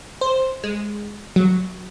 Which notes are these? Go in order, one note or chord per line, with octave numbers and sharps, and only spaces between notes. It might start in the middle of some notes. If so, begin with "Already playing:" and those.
C5
G#3
F#3